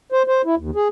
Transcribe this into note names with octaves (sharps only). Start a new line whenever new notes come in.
C5
C5
E4
D#2
G#4